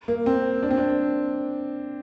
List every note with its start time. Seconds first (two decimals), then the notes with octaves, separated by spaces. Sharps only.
0.08 A#3
0.26 C4
0.63 D4
0.71 C4
0.78 D4